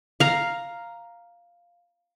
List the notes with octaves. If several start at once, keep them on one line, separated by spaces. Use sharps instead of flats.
F5 A#5